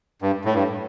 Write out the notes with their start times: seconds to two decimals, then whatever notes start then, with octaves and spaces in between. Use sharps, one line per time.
0.22 G2
0.45 A2
0.54 G2